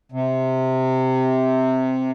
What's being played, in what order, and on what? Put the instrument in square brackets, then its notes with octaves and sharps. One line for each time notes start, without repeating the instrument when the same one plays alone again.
[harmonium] C3